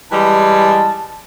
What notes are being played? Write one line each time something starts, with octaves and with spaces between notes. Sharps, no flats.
E3 G3 G#3 A5